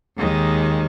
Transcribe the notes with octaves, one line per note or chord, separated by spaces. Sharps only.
D#2 D#3 G#3